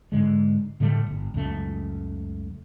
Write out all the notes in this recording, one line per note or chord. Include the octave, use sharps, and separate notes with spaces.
G#2 D3 G#3
A2 D3 G3 A3
G1
C#2 F#2 A3